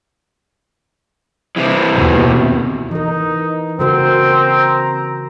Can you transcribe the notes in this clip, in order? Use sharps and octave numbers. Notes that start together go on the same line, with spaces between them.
C3 E3
D#2 B2
E3 D#4 A#4
C#3 C4 F#4 A#4 A#5